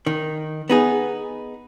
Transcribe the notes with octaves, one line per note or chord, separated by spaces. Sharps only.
D#3
B3 D#4 G#4